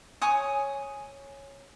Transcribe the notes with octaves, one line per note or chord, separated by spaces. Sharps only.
C#5 G#5 D#6